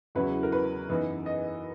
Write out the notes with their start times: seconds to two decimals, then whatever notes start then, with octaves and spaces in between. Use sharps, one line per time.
0.15 E2 C#3 F#3 C#4 E4 B4
0.43 A#4
0.52 B4
0.89 F#2 E3 B3 D#4
1.26 D#5